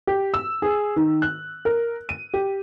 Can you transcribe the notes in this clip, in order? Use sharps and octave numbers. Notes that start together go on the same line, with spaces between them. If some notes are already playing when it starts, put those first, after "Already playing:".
G4
E6
G#4
D#3
F#6
A#4
D#7
G4